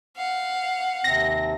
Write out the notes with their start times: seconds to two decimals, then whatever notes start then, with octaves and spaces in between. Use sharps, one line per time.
0.17 F5 F#5
1.04 D#2 C3 C4 A#6